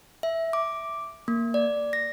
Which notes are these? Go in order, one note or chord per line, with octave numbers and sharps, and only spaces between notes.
E5
D6
A#3
D5
A#6